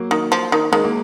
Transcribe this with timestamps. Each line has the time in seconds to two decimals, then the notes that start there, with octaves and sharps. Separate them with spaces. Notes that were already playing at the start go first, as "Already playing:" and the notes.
Already playing: F#3 A#3
0.11 D#3
0.32 F3
0.52 D#3
0.72 D#3 G#3
0.84 A#3